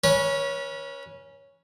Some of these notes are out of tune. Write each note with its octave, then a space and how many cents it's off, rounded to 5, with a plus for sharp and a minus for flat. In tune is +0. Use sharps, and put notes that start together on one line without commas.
C#4 +0 B4 -35